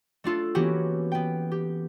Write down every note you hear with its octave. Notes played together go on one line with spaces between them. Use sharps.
A3 D4 F4 A4
E3 A#3 B3 C#4 F#4 G4
B3 G5
G4